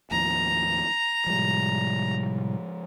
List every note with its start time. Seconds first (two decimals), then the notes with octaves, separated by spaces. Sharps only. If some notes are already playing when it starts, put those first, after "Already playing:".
0.11 D#2 A2 F3 A#5
1.27 A2 C3 F3 G3 G#3